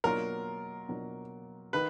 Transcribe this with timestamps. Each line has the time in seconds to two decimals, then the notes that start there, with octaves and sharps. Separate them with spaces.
0.04 B2 F#3 A#3 D4 F4 A#4
0.88 B2 F#3 A#3 D4 F4
1.73 D#3 B4